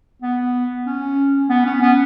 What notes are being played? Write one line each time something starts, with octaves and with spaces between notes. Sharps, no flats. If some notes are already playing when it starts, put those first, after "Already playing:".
B3
C#4
B3
C#4
B3